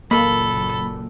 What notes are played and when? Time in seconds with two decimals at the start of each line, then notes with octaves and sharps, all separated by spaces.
0.11 F#1 A#2 A#3 A4 B5